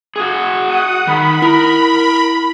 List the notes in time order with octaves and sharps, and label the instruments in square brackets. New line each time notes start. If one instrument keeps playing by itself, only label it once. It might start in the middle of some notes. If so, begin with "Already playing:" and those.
[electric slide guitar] F#4 G#4
[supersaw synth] F#5 D#6
[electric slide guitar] D#3 [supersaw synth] B5
[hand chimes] E4 [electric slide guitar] A#4